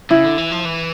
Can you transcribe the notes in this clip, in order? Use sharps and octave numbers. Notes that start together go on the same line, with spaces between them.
C#3 E4
D3
E3
F3
E3